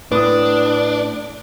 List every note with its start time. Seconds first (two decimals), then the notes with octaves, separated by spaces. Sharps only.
0.12 A2 D4 B4 D6 D#6